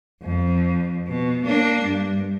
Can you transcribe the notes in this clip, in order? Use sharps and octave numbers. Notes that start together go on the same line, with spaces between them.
F2
B2
A#3 D4
G2